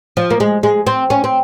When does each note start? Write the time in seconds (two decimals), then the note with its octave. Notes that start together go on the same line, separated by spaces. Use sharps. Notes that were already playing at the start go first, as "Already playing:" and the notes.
0.17 F3
0.31 A#3
0.40 G#3
0.63 G#3
0.87 C4
1.10 C#4
1.24 C4